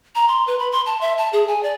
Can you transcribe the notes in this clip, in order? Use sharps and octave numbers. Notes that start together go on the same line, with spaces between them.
A#5
C6
B4
B5
C6
A5
E5
A5
G#4
G#5
D5